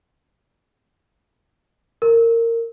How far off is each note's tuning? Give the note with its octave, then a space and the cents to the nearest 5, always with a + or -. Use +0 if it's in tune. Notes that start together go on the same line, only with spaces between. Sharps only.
A#4 -20